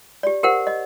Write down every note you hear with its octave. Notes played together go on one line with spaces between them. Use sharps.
G4 D5
G4 A#4 C5 F#5
D#5